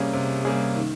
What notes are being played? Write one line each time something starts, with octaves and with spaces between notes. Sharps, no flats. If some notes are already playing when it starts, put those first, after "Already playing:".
Already playing: C3 G3 A#3 C#4 G#4
C3
G3 A#3 C#4 G#4
D#3